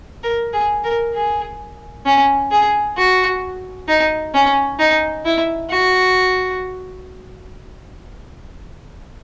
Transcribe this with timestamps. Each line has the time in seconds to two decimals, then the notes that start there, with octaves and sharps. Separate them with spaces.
0.23 A#4
0.53 G#4
0.84 A#4
1.14 G#4
2.06 C#4
2.51 G#4
2.97 F#4
3.88 D#4
4.34 C#4
4.79 D#4
5.25 E4
5.71 F#4